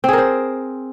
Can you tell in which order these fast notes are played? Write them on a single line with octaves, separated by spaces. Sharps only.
C4 G#4 A#4 C5